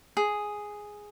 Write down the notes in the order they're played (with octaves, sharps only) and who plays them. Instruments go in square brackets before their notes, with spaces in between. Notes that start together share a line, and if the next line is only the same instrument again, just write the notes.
[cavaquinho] G#4